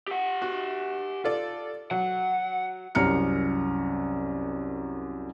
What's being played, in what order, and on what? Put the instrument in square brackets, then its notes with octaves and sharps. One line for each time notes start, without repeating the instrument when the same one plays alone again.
[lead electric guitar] G4 F#5
[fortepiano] F#4
F4 A4 D5
[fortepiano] F#3 [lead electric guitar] F#5
[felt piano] C2 F#2 A#5 F6 C#7